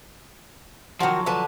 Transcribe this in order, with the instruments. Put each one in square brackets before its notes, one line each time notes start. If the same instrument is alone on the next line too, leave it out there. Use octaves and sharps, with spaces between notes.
[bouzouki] D#3 F#4 [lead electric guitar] F3 F#3
[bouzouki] D3 B4 A5